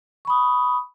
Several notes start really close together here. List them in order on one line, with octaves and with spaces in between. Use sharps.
C#6 B5 D#6